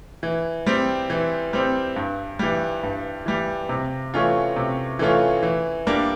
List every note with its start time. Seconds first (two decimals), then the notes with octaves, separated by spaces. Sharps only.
0.23 E3
0.66 G3 C4
1.10 E3
1.53 G3 C4
1.96 G2
2.39 E3 G3
2.83 G2
3.26 E3 G3
3.69 C3
4.14 E3 A3 C#4 F4
4.56 C3
4.99 E3 A3 C#4 F4
5.43 E3
5.87 G3 A#3 D4